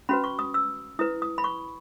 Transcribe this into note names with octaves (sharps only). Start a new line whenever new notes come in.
C#4 F#4 B4 B5
C#6
D#6
E6
E4 B4 D#6
D#6
B5
C#6